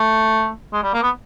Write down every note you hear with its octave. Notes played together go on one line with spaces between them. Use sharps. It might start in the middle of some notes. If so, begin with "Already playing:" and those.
Already playing: A3
G#3
G3
A#3
B3